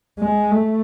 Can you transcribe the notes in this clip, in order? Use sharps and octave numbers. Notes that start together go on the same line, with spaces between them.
G#3
A3